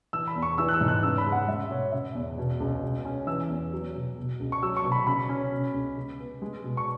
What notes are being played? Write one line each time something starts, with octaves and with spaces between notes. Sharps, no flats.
E3 E6
B5
E2
C#6
E3 E6
F#6
E6
G#2
F#6
C#3 E6
B5
G#3
F#5
G#3 E5
B2 C#5
C#3 E5
E2
B2
C#2
B2
C#4
E3 E6
E2
F#3
B2
B2
C#2
C#6
F#3 E6
C#6
B2
B5
C#3 B5
C#4
B2
C#2
C#3
B3
G#3
B2
C#6